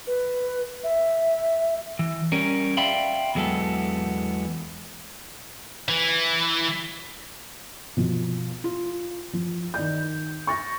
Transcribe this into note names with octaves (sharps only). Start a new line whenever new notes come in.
B4
E5
E3
G3 C#4 A#4
D5 E5 F5 G5 B5 C6
E2 F#3 G#3 B3 A4
E3
B2 F3
F4
F3
D#3 D5 G6
C#6 A6 A#6